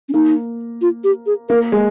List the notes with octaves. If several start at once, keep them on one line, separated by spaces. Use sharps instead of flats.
C#4
A#3 D#4
F4
G4
G#4
A#3 A#4
G#3